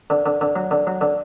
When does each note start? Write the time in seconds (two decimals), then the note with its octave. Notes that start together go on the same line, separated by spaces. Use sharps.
0.10 D3
0.26 D3
0.41 D3
0.56 F#3
0.71 D3
0.87 F#3
1.01 D3